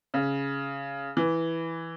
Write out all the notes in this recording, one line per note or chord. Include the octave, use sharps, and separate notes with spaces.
C#3
E3